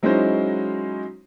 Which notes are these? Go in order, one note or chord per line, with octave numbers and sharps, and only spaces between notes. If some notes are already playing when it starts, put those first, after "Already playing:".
F#3 G#3 C#4 D#4 E4 C5